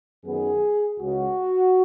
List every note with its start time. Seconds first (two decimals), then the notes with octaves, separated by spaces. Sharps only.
0.25 F#2 D#3 B3 G#4
0.99 C#2 C#3 G#3 F#4